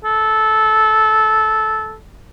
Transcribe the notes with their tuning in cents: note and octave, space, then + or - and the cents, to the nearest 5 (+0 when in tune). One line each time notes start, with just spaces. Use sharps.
A4 -15